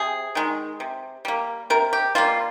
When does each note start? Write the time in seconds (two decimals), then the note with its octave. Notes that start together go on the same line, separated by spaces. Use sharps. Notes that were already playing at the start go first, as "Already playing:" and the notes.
Already playing: C3 G#4
0.35 D#3 G#3
0.80 C3
1.25 G3 A#3
1.70 C3 A#4
1.93 G4
2.15 G3 A#3 F4